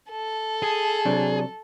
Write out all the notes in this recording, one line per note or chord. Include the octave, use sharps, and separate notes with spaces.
A4
G#4
C3 F#3 D4